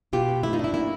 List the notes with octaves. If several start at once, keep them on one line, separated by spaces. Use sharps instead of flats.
B2 F4 G4
B3
A3 E4
D#4 F4
D4 E4
A#3 E4